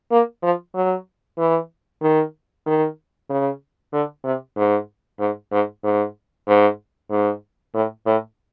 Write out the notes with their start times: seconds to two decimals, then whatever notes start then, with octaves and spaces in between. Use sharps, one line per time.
0.11 A#3
0.43 F3
0.75 F#3
1.38 E3
2.02 D#3
2.66 D#3
3.30 C#3
3.93 D3
4.25 C3
4.57 G#2
5.20 G#2
5.52 G#2
5.84 G#2
6.48 G#2
7.11 G#2
7.74 A2
8.06 A2